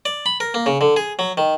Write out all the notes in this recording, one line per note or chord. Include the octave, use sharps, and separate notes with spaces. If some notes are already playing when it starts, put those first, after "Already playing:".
D5
B5
A#4
A#3
C#3
D3
G#4
F#3
D#3